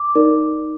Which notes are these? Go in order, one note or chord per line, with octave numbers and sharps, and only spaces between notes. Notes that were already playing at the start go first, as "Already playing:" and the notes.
Already playing: D6
D#4 A#4 D5